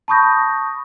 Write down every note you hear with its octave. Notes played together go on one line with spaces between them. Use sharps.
A5 B5 C#6 D#6 G6 A#6